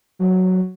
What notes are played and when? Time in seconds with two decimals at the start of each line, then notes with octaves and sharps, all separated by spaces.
0.19 F#3